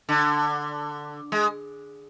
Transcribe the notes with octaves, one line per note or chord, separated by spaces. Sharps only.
D3
G#3